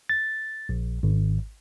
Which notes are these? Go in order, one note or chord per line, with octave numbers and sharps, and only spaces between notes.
A6
A#1
G#1